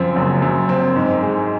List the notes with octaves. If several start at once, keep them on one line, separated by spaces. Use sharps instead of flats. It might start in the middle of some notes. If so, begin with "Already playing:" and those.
Already playing: F#2 F3 C4
F#1
F#2
C4
G#2
G#3